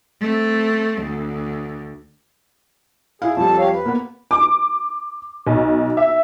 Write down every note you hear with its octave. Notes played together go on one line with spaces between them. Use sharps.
A3 C4
D2
E4 G#4 F5
F2 G3 A4 A5
G4 C#5 F5
B4
A#3 B3
D6
B1
E5